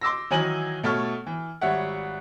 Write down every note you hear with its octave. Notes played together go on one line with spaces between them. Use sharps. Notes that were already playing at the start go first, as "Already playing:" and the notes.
C6 D6 E6 A#6
D#3 E3 F#3 D#4 G#5 F#7
B2 A3 A4 C#5 F6
E3
G#1 G3 C#5 E5 F#5